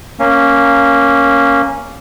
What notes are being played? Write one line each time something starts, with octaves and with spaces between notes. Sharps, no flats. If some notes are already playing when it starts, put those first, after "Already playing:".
A#3 C#4